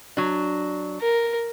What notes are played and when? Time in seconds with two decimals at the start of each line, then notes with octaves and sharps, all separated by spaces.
0.17 F#3 D4
1.01 A#4